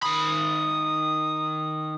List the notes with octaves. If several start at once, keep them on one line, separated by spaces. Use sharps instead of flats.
D#3 B5 D#6